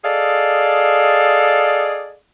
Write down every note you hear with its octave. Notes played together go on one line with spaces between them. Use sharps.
G#4 A4 D5 D#5 F5